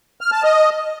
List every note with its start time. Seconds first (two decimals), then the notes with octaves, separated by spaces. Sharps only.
0.21 F6
0.32 A5
0.43 D#5